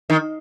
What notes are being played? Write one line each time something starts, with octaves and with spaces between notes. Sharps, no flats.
D#3